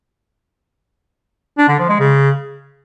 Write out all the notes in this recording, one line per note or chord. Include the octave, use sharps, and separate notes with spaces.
D4
D3
F3
G#3
C#3